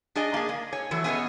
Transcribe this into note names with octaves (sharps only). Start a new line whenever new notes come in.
D4 G#4 D5 D#5 G#5
A#3 G#4
A#3
C#5 G#5
E3 F#3 A3
B3 C#4 G#4 C5 C#5 D#5